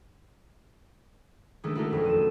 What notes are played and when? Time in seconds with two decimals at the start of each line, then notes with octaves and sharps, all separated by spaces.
1.64 D#3 G#3 A3 C#4 D4 A4
1.75 A3 E4 F#4 A4 A#4
1.91 B1 F2 B2
2.05 D#7 E7